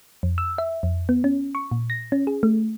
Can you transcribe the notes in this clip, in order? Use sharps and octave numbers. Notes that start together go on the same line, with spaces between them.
F2
E6
E5
F2
B3
C#4
C#6
A#2
A#6
C#4
G#4
A3